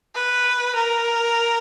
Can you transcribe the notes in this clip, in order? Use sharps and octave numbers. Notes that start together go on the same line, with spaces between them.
B4
A#4